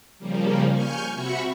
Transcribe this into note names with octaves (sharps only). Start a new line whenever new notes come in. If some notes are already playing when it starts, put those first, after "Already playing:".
C#3 F3 G3 A#3
G#5 C#6 F6 G6
C3 F#4 E5 B5 C#6 C#7